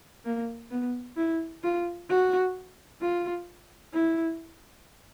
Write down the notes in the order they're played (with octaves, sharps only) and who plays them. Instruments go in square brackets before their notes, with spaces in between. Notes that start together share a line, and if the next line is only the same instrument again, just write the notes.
[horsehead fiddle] A#3
B3
E4
F4
F#4
F4
E4